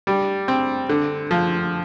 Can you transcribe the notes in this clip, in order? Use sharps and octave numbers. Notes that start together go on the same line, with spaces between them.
G3
C4
D3
F3